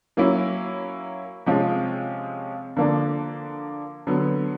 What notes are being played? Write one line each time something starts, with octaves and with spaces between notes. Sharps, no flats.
F#3 A#3 C#4 E4
C3 F3 G#3 C#4 F4
D3 F3 A#3 D4
D3 F#3 B3